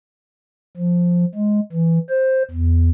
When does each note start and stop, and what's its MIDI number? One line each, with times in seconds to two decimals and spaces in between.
0.77 1.25 53
1.35 1.60 56
1.72 1.99 52
2.10 2.43 72
2.51 2.90 40